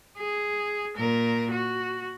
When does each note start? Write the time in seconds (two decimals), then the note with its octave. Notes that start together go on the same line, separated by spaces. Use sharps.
0.18 G#4
0.97 A#2 A#4
1.51 F#4